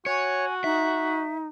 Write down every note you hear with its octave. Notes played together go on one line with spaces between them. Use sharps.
F#4 C#5 G#5
D#4 E5